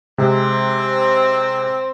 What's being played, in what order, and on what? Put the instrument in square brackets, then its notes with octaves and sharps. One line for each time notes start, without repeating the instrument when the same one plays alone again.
[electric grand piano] C3 G#3 [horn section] C4